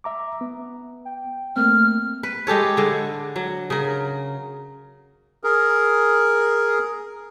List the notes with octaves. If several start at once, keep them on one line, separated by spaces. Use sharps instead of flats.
E5 A#5 D6
B3
G5
A3 A#3 C4 F6
B4
G#3 G4 A4 C#5
D3 G#3
F#3
C#3 A#4
G#4 A#4